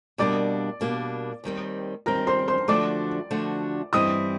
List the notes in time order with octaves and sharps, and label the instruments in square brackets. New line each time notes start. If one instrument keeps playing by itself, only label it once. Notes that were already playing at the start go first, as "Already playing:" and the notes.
[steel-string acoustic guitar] B2 G3 A#3 D4 [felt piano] D5 D6
[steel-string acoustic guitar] B2 G3 A#3 D4
D#2 D#3 G3 C4
[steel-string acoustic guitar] D#2 D#3 G3 C4 [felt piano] A#4 A#5
[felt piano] C5 C6
C5 C6
[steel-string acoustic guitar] D3 F3 A3 D4 F#4 [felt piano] D5 D6
[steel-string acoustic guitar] D3 F3 A3 D4 F#4
[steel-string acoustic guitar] G2 E3 G3 C4 E4 [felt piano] D#5 D#6